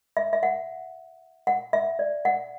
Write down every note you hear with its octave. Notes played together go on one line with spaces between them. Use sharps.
E5
E5
F#5
F#5
E5
D5
F#5